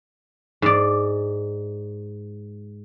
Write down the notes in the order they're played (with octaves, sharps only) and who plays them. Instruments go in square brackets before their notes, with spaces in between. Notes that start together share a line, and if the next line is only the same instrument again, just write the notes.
[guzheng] G#2 D5